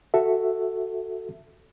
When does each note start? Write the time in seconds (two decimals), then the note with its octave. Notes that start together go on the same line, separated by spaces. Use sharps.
0.14 F#4 A4 E5